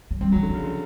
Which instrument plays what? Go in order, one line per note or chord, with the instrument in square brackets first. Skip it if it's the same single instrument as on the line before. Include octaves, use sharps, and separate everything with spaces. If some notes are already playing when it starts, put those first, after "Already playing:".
[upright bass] F#3
[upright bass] G3 [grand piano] C4
[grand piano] F#3
[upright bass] F3
[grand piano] D3
[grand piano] C#3 [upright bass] F3
[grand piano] D3